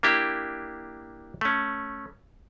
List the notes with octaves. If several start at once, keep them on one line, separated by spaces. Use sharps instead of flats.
A#3 D4 E4 G4
A3 C#4